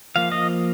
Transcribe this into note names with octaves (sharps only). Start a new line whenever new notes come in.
F3 A#3 F5
D#5